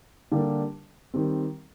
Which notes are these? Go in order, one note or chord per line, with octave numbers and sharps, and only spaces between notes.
D3 G3 A#3 D4 G4
D#3 G3 C4